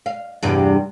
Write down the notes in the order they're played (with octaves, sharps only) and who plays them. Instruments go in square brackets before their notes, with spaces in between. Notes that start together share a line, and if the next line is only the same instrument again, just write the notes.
[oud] F5
E2 G2 C3